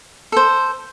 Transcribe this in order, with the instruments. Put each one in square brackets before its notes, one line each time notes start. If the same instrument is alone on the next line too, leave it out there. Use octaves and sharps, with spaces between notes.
[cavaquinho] A4 C5